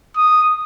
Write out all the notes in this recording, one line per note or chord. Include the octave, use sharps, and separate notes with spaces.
D#6